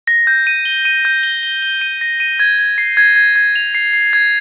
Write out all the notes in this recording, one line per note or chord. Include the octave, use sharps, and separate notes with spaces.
A#6
G6
D#7
G7
D#7
G6
G7
G7
G7
D#7
A#6
D#7
G#6
G#6
C7
G#6
G#6
G#6
F7
C7
C7
G#6